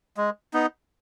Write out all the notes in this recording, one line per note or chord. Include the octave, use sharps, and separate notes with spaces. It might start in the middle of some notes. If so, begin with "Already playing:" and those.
G#3
B3 D#4